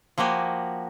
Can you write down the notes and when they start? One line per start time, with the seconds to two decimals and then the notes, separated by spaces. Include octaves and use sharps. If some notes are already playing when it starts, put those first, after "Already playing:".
0.18 F3 A#3 F#4 G4 G#5